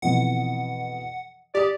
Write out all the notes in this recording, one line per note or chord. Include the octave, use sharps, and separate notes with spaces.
F2 B2 E3 F#5
G4 D5 D6 D#6